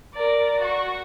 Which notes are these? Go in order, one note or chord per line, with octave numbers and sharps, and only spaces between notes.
A#4 D5
F#4 C#6